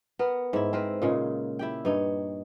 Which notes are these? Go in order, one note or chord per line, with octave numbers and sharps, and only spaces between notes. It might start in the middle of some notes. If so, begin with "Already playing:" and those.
B3 A#4
G#2 E4
C4 A#4 B4
A#2 C#3 G#3
E4 G4 G5
G2 D#4 C#5